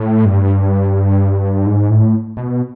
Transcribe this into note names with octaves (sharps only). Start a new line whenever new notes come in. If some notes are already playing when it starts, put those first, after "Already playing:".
Already playing: A2
G2
G#2
A2
B2